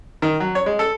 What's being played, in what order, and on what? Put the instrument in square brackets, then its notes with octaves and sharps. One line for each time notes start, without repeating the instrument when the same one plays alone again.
[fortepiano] D#3
F#3
C#5
G#3
A4